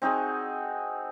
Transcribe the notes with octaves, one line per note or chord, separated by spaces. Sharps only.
C4 D#4 F#4 G#4